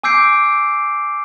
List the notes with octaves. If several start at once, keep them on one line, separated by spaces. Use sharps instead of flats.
G#5 D6 E6 G6 C7 D7